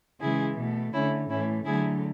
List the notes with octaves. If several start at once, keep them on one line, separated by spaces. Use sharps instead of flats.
C#3 E3 G#3 E4 G#4
B2 A3
D3 A3 C#4 E4
A2 E3 A3 C#4 E4
D3 F#3 A3 E4 G#4